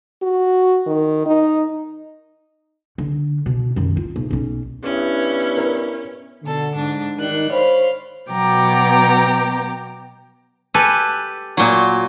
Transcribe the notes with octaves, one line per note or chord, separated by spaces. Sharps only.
F#4
D#3
D#4
D3
B2
F#2 D#3
F4
B1
B1 C#4
G2 B3 C#4 E4
A#4 B4
B2 D3 A4
G#2 D4
D#3 G3 D4 F#6
C5 C#5 F5 B5 C6
B2 F#3 B3 G5 A#5 D6
G4 A4 B4 G#5
A#2 F#3